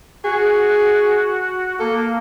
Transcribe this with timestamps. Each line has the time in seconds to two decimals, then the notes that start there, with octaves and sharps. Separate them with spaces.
0.24 F#4 G#4
1.80 A#3 A4